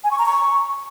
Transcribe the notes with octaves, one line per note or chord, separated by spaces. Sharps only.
G#5
C#6
A#5
C#6